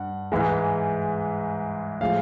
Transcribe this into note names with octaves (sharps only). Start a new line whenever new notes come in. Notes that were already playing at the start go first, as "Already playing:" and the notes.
Already playing: G2 F#5
G#2 E3 G#3
A2 F3 G#3 F5